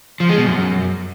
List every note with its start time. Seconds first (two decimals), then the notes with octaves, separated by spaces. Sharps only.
0.20 F3
0.29 G#3
0.38 B2
0.46 F#2